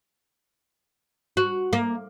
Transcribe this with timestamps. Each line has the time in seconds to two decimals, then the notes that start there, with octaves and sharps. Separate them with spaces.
1.37 F#4
1.73 A#3